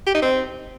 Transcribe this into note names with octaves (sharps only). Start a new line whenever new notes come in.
G4
D#4
C4